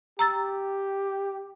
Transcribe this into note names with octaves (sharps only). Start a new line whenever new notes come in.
G4 A#5 E6 A6